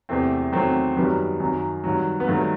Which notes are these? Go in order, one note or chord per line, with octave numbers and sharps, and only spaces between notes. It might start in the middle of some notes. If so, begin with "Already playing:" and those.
E2 C3 E3 A3 C4
E2 D#3 F#3 A3 C4
F#2 D#3 F#3 G3 B3
F#2 D#3 F#3
G2 D#3 F#3
B3
G2 D#3 F#3 A3